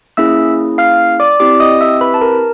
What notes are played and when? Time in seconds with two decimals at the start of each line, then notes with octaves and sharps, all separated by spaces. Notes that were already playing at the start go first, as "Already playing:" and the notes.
0.17 A#3 C#4 E4 G#4 E5 E6
0.78 F5 F6
1.20 D5 D6
1.40 C4 E4 G4 D5 D6
1.60 D#5 D#6
1.81 E5 E6
2.01 B4 B5
2.14 A5
2.21 A#4 A#5